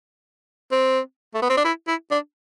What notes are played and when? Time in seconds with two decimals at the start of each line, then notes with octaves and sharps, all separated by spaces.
0.72 C4
1.34 A3
1.42 B3
1.49 C4
1.57 D4
1.65 E4
1.88 E4
2.11 D4